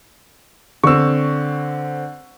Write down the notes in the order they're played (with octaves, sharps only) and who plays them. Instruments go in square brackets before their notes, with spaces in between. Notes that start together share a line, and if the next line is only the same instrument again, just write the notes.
[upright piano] D3 C4 [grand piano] C#6 E6